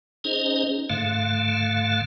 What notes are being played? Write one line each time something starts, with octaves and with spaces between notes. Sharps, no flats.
C#4 D#4 G#4 C5 D#5
G#2 D3 A3 F5